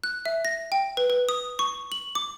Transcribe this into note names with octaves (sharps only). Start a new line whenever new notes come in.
F#6
E5
A#6
G5
B4
B4
D#6
C#6
F#7
D6